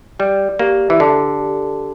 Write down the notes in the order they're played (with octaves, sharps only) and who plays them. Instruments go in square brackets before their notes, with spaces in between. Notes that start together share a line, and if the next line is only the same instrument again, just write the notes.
[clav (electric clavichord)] G3 [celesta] D5
[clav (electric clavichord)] A#3 [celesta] G4
[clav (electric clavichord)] E3
[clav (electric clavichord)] D3 [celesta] A5
[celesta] G4